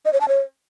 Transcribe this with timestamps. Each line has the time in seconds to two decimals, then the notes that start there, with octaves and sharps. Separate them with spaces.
0.05 D#5
0.13 C#5
0.21 A5
0.28 C#5